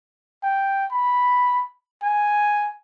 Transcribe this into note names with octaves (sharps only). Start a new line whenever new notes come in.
G5
B5
G#5